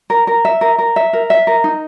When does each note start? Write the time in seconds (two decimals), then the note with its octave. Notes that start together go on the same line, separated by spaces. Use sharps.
0.10 A#4
0.27 A#4
0.45 E5
0.61 A#4
0.79 A#4
0.96 E5
1.13 A#4
1.30 E5
1.47 A#4
1.64 D#4